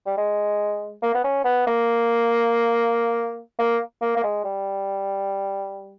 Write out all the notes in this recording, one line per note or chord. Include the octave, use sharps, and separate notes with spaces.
G3
G#3
A#3
B3
C#4
B3
A#3
A#3
A#3
A#3
G#3
G3